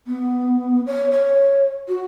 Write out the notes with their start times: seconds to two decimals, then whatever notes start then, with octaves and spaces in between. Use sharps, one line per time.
0.07 B3
0.86 C#5
1.11 C#5
1.88 F#4